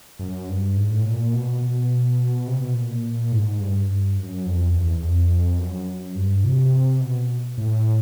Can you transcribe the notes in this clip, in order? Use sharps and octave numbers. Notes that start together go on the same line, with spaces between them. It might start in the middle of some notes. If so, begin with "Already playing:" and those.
F#2
G2
G#2
A2
A#2
B2
B2
C3
B2
A#2
G#2
G2
F#2
F2
E2
E2
F2
F#2
G2
C3
B2
A2